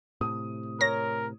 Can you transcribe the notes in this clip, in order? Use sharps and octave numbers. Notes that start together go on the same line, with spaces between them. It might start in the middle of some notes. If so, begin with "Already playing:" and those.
A2 C3 D#6
A#4 C#5 A#6